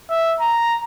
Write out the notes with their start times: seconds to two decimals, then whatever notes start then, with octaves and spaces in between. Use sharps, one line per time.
0.10 E5
0.40 A#5